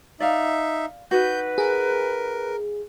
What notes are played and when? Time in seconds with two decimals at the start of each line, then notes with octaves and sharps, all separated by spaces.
0.20 D#4 D5 E5 F5
1.11 D#4 F#4 B4 G6
1.58 G#4 A#4